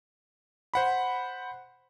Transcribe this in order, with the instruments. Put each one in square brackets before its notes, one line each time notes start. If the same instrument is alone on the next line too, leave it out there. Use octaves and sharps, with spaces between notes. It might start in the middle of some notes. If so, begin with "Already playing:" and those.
[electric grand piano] C5 F#5 B5